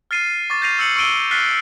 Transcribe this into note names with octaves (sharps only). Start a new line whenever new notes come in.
F6 A6 C7 D#7
C#6 D6 A6
G6 A6 A#6 C7 D#7 F7
E6 G6 C7 C#7 F#7
C#6 E6 C7 D7 D#7 G7
F6 F#6 A6 B6 C7 G7